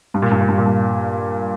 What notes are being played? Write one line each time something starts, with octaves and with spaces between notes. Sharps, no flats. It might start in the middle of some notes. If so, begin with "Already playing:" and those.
G2
A#2
G2
A#2
G2
A#2
G2